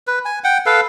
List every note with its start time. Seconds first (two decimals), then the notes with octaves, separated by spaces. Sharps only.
0.07 B4
0.25 G#5
0.44 F#5 G5
0.66 A4 B4 F5